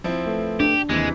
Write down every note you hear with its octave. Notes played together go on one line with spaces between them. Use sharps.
F3 C4 E4
A3 A4 B4
D4 G4
D#2 C3 E3 G#3